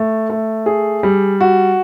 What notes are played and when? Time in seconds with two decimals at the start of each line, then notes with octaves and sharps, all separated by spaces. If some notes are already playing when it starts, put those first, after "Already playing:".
Already playing: A3
0.30 A3
0.66 G#4
1.03 G3
1.41 F#4